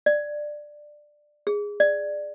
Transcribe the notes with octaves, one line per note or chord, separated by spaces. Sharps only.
D5
G#4
D5